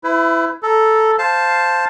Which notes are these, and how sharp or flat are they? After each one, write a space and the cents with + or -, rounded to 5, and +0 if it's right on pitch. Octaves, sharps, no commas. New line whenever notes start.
E4 +10 B4 +40
A4 +0 A#5 +0
C5 +0 F5 +0 A5 +0